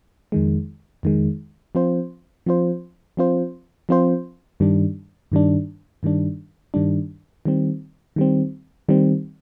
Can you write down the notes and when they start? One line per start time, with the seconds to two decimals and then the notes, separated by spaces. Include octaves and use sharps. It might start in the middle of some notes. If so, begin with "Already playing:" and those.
0.32 F2 D#3 G#3
1.03 F2 D#3 G#3
1.75 F3 C4 F4 C5
2.46 F3 C4 F4 C5
3.17 F3 C4 F4 C5
3.89 F3 C4 F4 C5
4.60 G2 D#3 G3 D4
5.32 G2 D#3 G3 D4
6.03 G2 D#3 G3 D4
6.74 G2 D#3 G3 D4
7.45 D#3 G3 C4
8.16 D#3 G3 C4
8.88 D#3 G3 C4